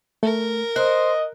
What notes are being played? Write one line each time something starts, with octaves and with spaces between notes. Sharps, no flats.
A3 A#4
C5 D#5 F#6